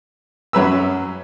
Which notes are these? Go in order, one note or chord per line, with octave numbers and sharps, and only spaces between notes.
F#2 F#3 B4 E6